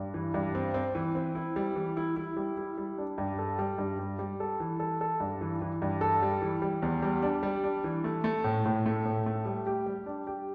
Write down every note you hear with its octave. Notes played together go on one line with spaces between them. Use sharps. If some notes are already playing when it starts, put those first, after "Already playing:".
Already playing: G2
E3
G2
C4
C4
E3
C4
E4
G3
E3
E4
E4
G3
E4
G3
D4
G2
A4
G3
G2
G3
G3
A4
E3
A4
A4
G2
E3
E3
G2
A4
G3
E3
G3
E2
G3
D4
G3
D4
E3
A3
A3
A2
A2
A3
A2
A3
G3
G4
G3
D4
G4